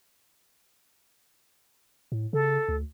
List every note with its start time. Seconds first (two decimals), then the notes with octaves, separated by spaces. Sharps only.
2.12 A2
2.33 C#3 A4
2.68 D2